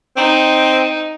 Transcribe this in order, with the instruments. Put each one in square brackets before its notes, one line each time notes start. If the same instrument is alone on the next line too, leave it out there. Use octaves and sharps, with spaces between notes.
[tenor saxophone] C4 [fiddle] D#4